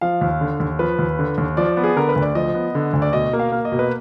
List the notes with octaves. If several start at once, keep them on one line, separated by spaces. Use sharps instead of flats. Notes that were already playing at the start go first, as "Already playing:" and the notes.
F3 F5
D#2
D3
D#2
F3 B4
D#2
D3
D#2
F3 D5
B3
G#4
D3 A#4
B4
D2
D5
F3 D#5
B3
D3
D2
D5
B2 D#5
A#3
F5
A#3
D#5
B2
B4